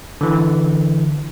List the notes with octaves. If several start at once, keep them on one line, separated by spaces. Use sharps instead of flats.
D3 E3